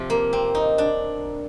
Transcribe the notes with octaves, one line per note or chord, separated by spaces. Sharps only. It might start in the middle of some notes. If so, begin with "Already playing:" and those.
Already playing: C3 F3
A#3
C4
D#4
D4